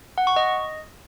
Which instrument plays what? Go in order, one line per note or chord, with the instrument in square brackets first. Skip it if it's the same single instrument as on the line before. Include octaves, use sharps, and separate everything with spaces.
[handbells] F#5
C#6
D#5